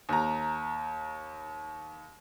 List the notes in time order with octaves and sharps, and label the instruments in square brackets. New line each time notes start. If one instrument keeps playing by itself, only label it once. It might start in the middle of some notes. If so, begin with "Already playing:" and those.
[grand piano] D#2 A#5